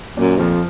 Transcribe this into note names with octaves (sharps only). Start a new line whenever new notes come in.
F#2 A#2
F2 F3